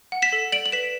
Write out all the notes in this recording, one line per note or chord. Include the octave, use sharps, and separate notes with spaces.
F#5
B6 E7
A4
D5 D7 F#7
F#7
B4 B6 E7